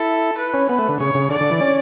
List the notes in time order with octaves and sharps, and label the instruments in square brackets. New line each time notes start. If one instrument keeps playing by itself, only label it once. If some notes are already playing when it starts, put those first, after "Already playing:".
Already playing: [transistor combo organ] E4 [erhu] A4
[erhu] B4
[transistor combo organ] C#4
[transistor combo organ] B3 [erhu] B4
[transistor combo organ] A3
D3
[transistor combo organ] C#3 [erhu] C#5
[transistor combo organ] C#3
[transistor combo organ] D3 [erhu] D5
[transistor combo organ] D3
E3
C#4